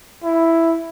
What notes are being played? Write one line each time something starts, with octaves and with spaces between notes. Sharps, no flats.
E4